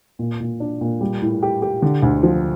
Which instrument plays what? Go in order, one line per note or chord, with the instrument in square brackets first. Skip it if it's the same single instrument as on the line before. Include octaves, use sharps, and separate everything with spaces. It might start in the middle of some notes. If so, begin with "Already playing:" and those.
[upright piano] A#2
A#2
D4
A#2
G3
A2
G4
G4
D3
D2
F3